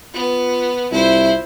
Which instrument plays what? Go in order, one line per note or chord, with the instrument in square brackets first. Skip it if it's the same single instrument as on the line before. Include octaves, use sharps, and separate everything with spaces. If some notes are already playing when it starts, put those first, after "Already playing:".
[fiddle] B3 [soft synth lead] F4
[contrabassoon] C2 [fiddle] E4 C5 [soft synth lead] F4 [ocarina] E5